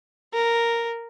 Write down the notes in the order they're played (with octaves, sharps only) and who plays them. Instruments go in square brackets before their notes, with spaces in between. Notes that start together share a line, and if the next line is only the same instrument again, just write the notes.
[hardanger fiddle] A#4